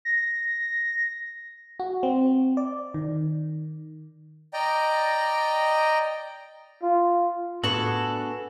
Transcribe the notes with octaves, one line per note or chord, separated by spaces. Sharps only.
A#6
F#4
C4
D5
D#3
D5 D#5 G5 A#5
F4
A2 B3 D4 F#4 G#4 A4 C#6 F#7